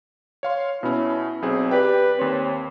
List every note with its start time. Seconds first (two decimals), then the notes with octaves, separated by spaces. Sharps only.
0.43 C#5 F5 C6
0.83 B2 C#4 E4
1.42 B1 C4 G#4
1.71 G4 B4 D5 G5
2.19 D#2 C4 C#5